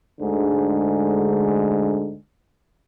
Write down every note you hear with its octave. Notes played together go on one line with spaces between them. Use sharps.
D2 G#2 D3 G#3